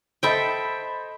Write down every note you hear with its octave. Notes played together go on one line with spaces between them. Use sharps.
A4 C5 D#5 E5 G5 B5